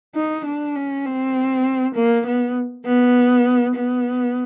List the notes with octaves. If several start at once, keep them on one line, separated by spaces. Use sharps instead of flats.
D#4
D4
C#4
C4
A#3
B3
B3
B3